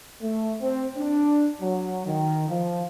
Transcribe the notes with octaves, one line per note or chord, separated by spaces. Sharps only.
A3
C4
D4
F#3
D#3
F3